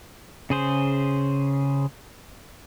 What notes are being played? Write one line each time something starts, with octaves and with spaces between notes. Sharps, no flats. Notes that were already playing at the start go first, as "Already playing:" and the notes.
C#3 G#4 C5